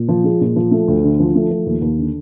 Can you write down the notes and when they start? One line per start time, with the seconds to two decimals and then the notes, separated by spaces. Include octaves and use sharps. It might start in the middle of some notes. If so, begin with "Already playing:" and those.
Already playing: A#2
0.08 F3
0.24 G#3
0.41 A#2
0.56 F3
0.71 A3
0.88 D2
1.04 D3
1.20 F3
1.35 A3
1.51 F3
1.66 D#2
1.82 D#2
1.98 D3